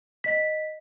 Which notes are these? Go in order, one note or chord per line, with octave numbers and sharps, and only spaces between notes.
D#5 B6